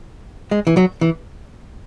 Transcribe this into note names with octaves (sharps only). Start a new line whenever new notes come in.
G#3
E3
F#3
E3